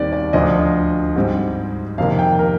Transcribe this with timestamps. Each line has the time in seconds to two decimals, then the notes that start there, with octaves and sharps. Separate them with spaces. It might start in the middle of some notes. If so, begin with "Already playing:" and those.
Already playing: D#2 D#3 G3 C4 D5
0.12 D5
0.33 D2 D3 F3 D#5
1.16 G#2 G3 C4
1.98 F2 C3 D#3 A#3 F5
2.19 G5
2.39 A#4